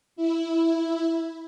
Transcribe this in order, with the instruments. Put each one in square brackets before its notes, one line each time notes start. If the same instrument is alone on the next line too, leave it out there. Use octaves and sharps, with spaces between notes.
[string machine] E4